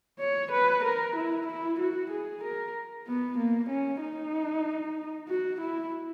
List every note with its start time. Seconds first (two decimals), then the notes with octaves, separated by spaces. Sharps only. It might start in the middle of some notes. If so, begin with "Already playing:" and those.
0.20 C#5
0.52 B4
0.84 A#4
1.16 E4
1.47 E4
1.80 F#4
2.11 G#4
2.43 A#4
3.07 B3
3.38 A#3
3.70 C#4
4.02 D#4
5.29 F#4
5.60 E4